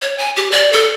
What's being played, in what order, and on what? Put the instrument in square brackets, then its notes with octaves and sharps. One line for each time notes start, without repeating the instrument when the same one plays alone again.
[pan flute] C#5
G#5
G4
D5
A4